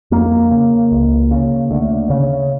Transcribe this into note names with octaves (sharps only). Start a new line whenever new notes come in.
F2 A#3
C#3
C#2
C#3
D2
C#3